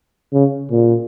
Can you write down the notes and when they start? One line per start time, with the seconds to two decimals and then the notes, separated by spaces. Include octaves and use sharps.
0.33 C#3
0.71 A#2